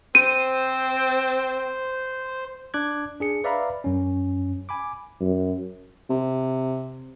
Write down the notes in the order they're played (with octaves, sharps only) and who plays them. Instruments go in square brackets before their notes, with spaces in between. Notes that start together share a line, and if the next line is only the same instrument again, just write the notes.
[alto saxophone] C4 [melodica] C5 [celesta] D#7
[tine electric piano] D4 D6 F#6 G#6
D4 G#4 C#7
B4 D5 E5 F5 A#5 B5
F#2 C#4
G#5 B5 D6
[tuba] F#2
[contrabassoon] C3